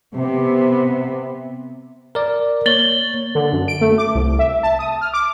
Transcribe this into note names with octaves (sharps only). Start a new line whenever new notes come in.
C3 B3
A#4 D5
A#3 C#5 A6 F#7 G7
D3
F#2
D7
A3
D6
C2
E5
A5
D#6
F6
D6